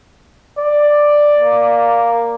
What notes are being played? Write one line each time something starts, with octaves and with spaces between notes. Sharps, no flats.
D5
A#3